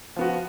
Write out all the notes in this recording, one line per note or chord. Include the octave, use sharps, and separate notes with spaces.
F3 B3 F#4